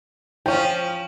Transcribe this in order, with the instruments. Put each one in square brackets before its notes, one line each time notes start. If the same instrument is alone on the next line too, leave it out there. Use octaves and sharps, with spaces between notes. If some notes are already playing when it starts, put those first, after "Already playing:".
[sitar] F3 C#4 [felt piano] G5